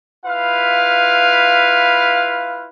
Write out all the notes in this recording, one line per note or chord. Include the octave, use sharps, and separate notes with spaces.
E4 F4 B4 F5